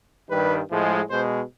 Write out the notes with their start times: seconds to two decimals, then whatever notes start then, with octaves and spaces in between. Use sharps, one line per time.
0.29 G2 D#3 G3 B4
0.70 A2 F3 G#3
1.09 B2 G#3 C5